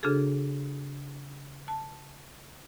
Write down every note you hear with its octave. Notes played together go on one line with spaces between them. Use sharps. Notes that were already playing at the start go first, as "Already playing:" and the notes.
C#3 D4 F#4 G#4 A4
A5